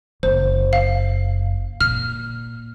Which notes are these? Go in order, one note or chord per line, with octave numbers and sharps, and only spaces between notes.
F#1 C5
F5
A#2 F6